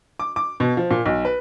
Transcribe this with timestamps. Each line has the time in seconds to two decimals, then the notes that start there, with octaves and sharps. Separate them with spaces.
0.19 D6
0.36 D6
0.60 B2
0.77 F3
0.91 A#2
1.06 B1
1.25 B4